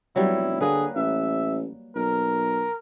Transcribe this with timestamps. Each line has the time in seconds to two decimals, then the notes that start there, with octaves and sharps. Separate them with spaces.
0.16 F1 F#3 G3 B3 E4
0.61 D3 A#3 G#4 B4
0.95 A1 E5
1.95 B1 A#4